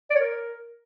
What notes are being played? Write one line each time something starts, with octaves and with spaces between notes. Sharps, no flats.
D5
C#5
A#4